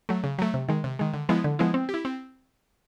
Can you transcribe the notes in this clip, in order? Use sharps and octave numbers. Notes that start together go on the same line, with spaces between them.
F#3 A3
C#3
F#3 A3
C3
D#3 G#3
C3
D#3 G#3
D3
F3 G#3 B3 E4
D3
F3 G#3 B3 E4
C4
G4
E4
C4